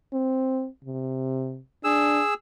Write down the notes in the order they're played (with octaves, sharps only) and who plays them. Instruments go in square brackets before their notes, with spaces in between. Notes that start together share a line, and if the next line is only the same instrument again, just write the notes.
[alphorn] C4
C3
[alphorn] D4 [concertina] G#4 E6